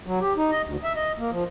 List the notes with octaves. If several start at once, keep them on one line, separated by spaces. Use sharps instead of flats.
F#3
G4
D#4
D#5
D2
E5
D#5
A#3
F3